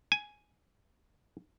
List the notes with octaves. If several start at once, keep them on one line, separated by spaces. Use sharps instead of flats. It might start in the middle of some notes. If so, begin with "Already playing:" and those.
G#5